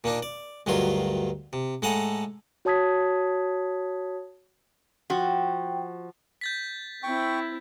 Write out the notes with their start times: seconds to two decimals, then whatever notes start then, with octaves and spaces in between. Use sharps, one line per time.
0.04 A#2 A#3 D4 D#4
0.23 D5
0.66 D2 G2 D#3 F#3 F4 C6
1.53 C3
1.82 A2 G#3 A4 F#5 G#5 A#5
2.65 F#4 C#5 A5 D#6 G#6 B6
5.10 F3 F#4 G5
6.41 G6 A6 B6
7.03 C4 E4 G5 C#6